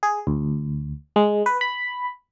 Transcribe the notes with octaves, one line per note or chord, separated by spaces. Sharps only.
G#4
D2
G#3
B4
B5